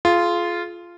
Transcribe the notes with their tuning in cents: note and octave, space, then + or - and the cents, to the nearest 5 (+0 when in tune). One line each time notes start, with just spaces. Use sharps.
F4 -10 G#4 +35